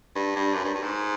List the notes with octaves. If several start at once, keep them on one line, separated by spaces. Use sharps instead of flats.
G2
G2
F#2
G2
G2
G#2